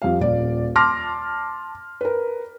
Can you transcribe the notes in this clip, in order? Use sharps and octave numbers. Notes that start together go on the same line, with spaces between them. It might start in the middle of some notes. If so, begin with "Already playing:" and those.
F2 G3 F5
D#1 D5
A5 C6 D6 F6 A#6
A#4 B4